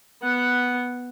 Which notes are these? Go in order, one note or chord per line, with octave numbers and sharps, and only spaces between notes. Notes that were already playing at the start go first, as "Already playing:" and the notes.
B3 F#5